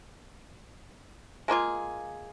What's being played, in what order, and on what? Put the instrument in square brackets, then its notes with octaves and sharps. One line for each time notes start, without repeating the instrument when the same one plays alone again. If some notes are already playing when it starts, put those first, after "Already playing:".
[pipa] G#3 A#3 F4 G#4